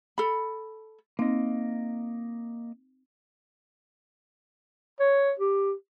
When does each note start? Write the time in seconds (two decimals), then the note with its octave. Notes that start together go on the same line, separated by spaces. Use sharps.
0.18 A4 B5
1.19 A#3 C4 D#4 D#5
5.00 C#5
5.40 G4